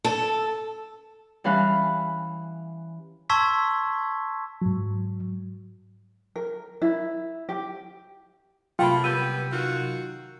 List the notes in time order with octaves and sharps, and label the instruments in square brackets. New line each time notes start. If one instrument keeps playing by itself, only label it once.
[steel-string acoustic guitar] A4
[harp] E3 G3 C#4 F5 B5 F#6
[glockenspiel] A5 C6 C#6 E6 G#6 B6
[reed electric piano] G#2 F#3
[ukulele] A#4
E4
G4
[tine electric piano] C3 F#3 [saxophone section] A3 A#3 [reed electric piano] F4 [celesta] G5 B5
[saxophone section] G3 B3 [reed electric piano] E6 G6 [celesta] D#7
[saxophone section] D#3 F4 F#4